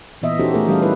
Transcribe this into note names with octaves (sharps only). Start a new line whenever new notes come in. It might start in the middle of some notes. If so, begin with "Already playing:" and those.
A#2 E3 B3 D#5 E5
C#4 D#4 F#4 G4 A4 C5
A3 G#4 A#4
E3 G3 C#4 A4 F5
D#4 E4 B4